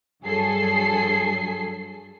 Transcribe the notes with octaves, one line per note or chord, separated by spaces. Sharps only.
G2 F#3 G#4 A4 C7